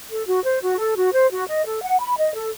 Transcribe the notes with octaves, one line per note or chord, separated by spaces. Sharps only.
A4
F#4
C5
F#4
A4
F#4
C5
F#4
D#5
A4
F#5
B5
D#5
A4